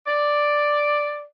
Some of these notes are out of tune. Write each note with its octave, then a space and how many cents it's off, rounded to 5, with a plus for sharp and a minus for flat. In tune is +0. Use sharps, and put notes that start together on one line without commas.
D5 +5